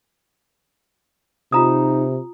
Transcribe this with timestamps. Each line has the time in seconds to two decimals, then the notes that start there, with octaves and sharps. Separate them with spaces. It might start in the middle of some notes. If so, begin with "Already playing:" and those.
1.52 C3 D#4 F4 A#5 D#6